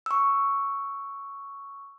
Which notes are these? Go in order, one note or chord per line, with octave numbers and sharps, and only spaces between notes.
C#6 E6